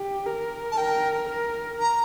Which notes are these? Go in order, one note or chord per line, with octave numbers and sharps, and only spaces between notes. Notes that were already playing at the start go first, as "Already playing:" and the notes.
Already playing: G4
A#4
A5
A#4 G5
A#4
A#5